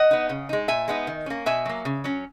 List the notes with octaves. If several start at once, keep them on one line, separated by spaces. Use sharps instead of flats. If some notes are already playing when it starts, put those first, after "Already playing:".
Already playing: D#5 F#5
B3 D#4
C#3
G#3 D#4
A#2 E5 G#5
G#3 B3 D#4
D#3
A#3 C#4
B2 E5 G#5
F#3 A#3
C#3
F#3 C#4